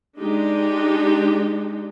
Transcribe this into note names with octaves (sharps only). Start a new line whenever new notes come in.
G#3 D4 D#4 G4